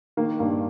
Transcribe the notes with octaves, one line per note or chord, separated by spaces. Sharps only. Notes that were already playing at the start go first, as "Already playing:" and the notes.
D#3 A#3
G2 A#3